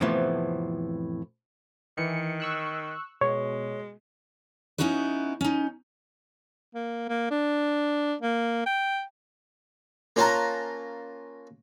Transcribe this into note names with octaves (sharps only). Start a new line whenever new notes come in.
F2 A2 C3 E3 F3 B3
D#3 E3 C#7
C#6 E6 F#6
B2 G#3 C#5
B3 C#4 D#4 E4 F#4 B4
C#4 D#4
A#3
A#3
D4
A#3
G5
A#3 C#4 F4 F#5 A5 A#5